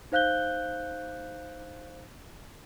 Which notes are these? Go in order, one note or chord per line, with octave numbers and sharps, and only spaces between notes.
D#4 C5 F5 F#6 G6 G7